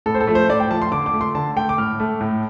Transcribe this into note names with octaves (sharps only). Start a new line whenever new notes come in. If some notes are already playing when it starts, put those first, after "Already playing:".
A2 A4
C5
A4
F3 A3
C5
A2 D5
G5
F3 A3 A5
C6
D3 D6
D6
A3
C6
D3 A5
A3 G5
D6
A2 F6
A3
A2